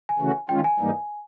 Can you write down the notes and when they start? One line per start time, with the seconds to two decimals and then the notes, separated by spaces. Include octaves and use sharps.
0.09 G#5
0.19 C#3 E3 A3 C#4 F#4
0.49 D#3 G#3 C#4 F4 G5
0.64 G#5
0.79 G#2 E3 G3 A#3 D#4